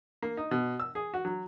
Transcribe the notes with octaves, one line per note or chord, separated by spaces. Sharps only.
A#3
D#4
B2
E6
G#4
F#4
F#3